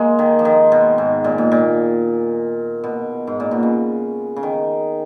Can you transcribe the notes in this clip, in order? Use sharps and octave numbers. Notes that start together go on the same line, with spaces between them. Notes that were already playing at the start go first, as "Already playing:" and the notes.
Already playing: G#3 A#3
D#3
F3
D#3
B2
G#2
A#2
G#2
A#2
B2
G#2
A#2
B2
C#3
C#3
D#3